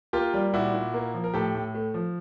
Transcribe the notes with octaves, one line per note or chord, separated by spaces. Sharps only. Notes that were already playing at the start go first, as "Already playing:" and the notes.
A#3 F4 G4
G3
A#2 E4 F#4
A#2
A#3
F3
A#4
A2 G4 A4
A2
A3
F3